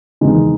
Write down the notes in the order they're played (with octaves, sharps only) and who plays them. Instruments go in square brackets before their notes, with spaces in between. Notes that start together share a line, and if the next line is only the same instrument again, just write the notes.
[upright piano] F#1 E2 D#3 G#3 D#4